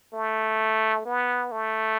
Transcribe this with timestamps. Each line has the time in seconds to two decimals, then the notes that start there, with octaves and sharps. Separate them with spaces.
0.13 A3
1.05 B3
1.52 A3